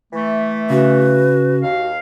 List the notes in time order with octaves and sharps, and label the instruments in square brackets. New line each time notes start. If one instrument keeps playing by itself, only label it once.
[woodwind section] E3 A3
[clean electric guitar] C#3 [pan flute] F#4 [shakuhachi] B4
[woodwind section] D#2 F5